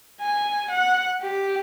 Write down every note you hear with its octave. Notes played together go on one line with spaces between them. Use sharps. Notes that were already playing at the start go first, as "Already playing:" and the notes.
G#5
F#5
G4